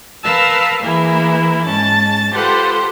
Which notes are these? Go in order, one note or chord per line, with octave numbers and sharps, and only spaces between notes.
A#4 B4 F5 A5 E6
E3 A#3 E4 G#4 A#4 B4
G#2 C#4 A5 A6
F4 G4 A4 B4 C5 F#5